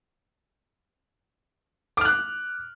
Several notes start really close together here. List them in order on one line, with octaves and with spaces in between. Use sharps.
D6 F6 F#6